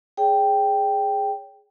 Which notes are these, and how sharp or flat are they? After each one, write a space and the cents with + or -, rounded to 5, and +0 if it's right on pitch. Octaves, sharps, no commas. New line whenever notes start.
G#4 +0 C#5 +35 G5 +0